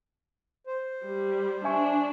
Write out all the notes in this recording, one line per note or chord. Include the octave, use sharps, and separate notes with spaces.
C5
G3
D4 E5 G#5 C#6